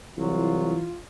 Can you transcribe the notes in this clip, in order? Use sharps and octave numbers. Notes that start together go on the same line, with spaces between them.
C2 E3 F#3 F4